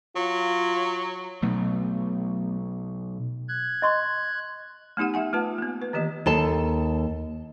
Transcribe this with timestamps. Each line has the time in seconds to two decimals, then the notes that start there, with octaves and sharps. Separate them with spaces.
0.16 F#3 F4
1.42 B1 F#3 A3 B3
3.49 F#6 G#6
3.82 D#5 C6 C#6
4.97 A3 B3 D#4 G4 F#5
5.14 G4 E5 F#5 G#5
5.33 A3 F4 B4 A5
5.58 A#3 B3
5.82 B4
5.93 D#3 E3 A#3 G4 D#5
6.26 D#2 A4 A5